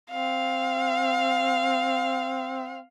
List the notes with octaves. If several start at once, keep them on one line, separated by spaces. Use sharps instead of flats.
C4 F5